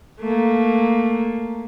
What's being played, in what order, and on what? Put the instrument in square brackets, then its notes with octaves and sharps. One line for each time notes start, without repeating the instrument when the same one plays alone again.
[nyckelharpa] A3 A#3